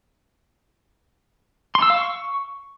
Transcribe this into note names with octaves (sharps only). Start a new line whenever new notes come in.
C6
E6
F5
C#6